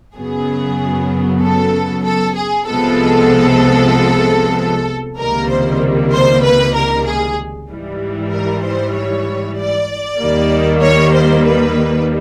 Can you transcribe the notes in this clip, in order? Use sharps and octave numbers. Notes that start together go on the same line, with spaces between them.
F#2 C#3 F#3 B3 G#4
A4
A4
G#4
C2 C3 F3 G#3 B3 A4
C#2 C3 D#3 G3 A#3 A#4
C5
C5
B4
A#4
G#4
G#2 E3 G3
A#4
C5
C#5
D5
D#2 D#3 G3 A#3
C#5
C5
B4